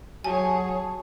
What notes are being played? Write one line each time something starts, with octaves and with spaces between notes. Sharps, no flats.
F#3 G#4 C#5 G#5 A5